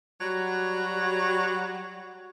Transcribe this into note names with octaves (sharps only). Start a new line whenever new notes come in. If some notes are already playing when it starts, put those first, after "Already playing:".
F#3 G3 F#4